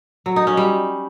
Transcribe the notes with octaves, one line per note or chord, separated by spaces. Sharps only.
F#3
D#4
C#4
G3